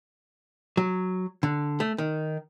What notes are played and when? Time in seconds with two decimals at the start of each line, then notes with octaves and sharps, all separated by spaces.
0.77 F#3
1.43 D3
1.80 A3
1.98 D#3